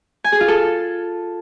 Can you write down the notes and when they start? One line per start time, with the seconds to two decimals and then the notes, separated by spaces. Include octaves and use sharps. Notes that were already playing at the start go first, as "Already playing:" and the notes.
0.24 G#5
0.32 G#4
0.40 F4
0.48 A4